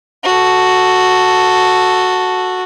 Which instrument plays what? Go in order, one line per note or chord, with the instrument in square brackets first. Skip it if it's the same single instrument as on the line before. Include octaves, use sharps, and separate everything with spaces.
[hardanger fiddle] F#4 A4